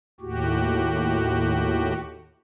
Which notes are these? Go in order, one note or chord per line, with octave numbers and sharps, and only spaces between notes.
D#2 A2 F#4 G4